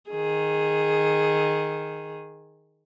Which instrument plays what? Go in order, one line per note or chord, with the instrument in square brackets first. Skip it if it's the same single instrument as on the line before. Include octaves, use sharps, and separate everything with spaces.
[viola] D#3 G#4